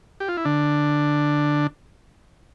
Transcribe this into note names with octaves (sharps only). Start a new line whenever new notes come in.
G4
F4
E4
D3 D4